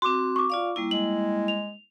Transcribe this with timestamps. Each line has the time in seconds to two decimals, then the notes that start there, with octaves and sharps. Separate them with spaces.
0.02 C4 F#4 C6 D6
0.36 C#6 D6
0.50 F4 D5 F5
0.76 G3 A#3 E4
0.91 G#3 F#7
1.48 F7